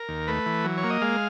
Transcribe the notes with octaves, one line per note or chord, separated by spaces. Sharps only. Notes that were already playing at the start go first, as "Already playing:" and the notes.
Already playing: A#4
D#2
A3 B4
E3
F#3
C#5
A#3
D#5
G#3 F5